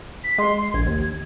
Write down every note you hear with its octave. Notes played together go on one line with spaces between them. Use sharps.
B6
G#3 C6
C6
A#1 G#6
D#2